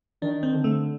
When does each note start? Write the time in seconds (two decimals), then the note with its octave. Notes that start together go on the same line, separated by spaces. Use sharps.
0.22 D#3 D4
0.43 C4
0.54 D3
0.64 A3